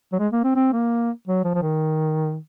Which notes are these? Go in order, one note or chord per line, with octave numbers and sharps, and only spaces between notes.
F#3
G#3
A#3
C4
C4
A#3
F#3
F3
F3
D#3